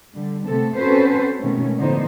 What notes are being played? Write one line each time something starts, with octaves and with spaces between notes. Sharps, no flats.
D3 G3
C3 A3 B3 C4 A4
C4 C#4 F#4 A4 B4 C5
B2 D#3 G#3 A3 C#4
A2 D3 F3 B3 D#4 C5